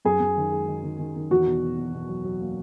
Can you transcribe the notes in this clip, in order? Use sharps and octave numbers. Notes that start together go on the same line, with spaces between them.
F#2 G#4
F#2
D#3
G#3
D#3
D#3
D#3
D#3
E2 F#4
B2
B2
E2
B2
F#3
F#3
A#3